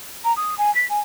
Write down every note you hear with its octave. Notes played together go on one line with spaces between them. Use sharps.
A#5
D#6
G#5
B6
G#5